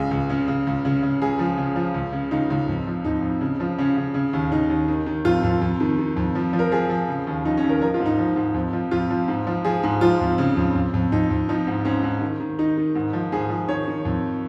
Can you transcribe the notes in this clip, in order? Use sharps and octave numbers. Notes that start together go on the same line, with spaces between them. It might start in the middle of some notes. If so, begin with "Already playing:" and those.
Already playing: C#2 C#3 G#4
C#2
C#3
C#3
C#2
C#3
C#3
C#2 G#4
F3
C#3
F3
C#2
C#3
C#2 D#4
C#2
F2
F3
F2 D#4
F2
C#3
F3
C#3 C#4
C#3
C#3
D#2
C#3 D#4
D#2
D#3
D#3
F2 F4
F2
F2
D#3
D#3
F2
F3
F3
A#4
F3 G#4
F3
C#3
D#2
F3 D#4
C#4
D#2
A#4
F3 A#4
F4
G#2
D#4
F3
G#2
F2
F3
F2 F4
F3
G#2
F3
F3 G#4
G#2
F3 F4
F2
C#3
F2
F2
F2
F2 D#4
F2
F3 D#4
G#2
G#2 C#4
G#2
D#3
D#3
D#3 D#4
D#3
G#2
F3
G#2 G#4
F3
D#3 C#5
D#3
F2